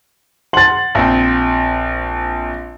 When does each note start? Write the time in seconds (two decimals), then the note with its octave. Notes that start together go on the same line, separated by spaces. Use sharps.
0.53 F#5 C6 A6 F#7
0.95 A#1 C4